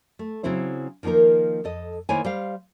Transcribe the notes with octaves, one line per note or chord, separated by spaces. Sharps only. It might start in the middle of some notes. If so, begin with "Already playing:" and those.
A3
C#3 F#3 C4 E4 C5
D#3 F3 A#3 D#4 A#4
F2 A4 D#5
D#3 A#3 E4 C5 C#5 G#5
G3 C5 F5